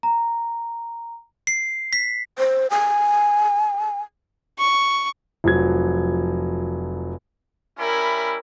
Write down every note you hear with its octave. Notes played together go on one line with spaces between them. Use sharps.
A#5
C7
B6
C5
G#5
C#6
F1 F3 F#3 G#6
G3 C#4 E4 A#4 B5